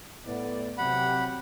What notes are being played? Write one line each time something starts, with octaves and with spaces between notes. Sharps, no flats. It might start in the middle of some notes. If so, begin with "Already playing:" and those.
A2 B3 D5
C3 F#3 G4 F#5 B5